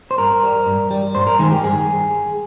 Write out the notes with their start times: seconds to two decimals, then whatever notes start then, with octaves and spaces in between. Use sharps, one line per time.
0.11 C5
0.18 G2 A#4
0.43 G3
0.66 G2
0.91 G3
1.15 G2 C5
1.27 A#4
1.39 D#3 G#3 G#4
1.51 G4
1.64 G2 G#4